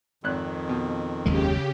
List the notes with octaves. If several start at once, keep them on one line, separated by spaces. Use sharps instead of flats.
G#1 F2 D#3 F#6
B2
F#1 D#2 C#3 G#3 G4